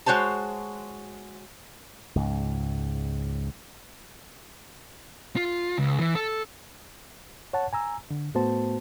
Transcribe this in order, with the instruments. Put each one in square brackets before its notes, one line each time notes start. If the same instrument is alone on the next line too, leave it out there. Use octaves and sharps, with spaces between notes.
[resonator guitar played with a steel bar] G#3 F#4 C5 C#5 A5
[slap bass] C#2 G#2
[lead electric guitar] F4
C#2
E3
A4
[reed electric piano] C#5 F#5 A5
G#5 A#5 E6
D3
A2 A3 B3 F#4 C5 A5